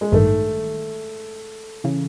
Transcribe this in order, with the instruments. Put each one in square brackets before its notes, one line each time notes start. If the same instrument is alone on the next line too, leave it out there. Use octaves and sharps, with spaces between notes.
[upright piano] G#3
[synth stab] A1 G2 D#3 [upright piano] A3
[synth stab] C#3 E3